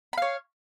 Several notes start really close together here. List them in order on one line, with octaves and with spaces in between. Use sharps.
B5 F5 C#5